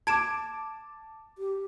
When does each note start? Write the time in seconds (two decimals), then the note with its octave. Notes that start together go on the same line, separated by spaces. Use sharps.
0.07 A5 D6 G#6 D7 E7
1.38 G4